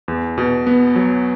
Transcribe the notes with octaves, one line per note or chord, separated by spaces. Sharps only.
E2
B2
B3
F#3